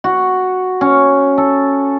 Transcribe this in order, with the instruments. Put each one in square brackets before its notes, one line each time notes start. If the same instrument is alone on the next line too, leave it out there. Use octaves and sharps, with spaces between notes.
[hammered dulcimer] F#4
C#4
A4